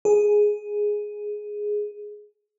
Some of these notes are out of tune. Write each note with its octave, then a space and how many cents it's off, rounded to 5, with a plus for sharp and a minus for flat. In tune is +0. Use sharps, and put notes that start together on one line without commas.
G#4 +5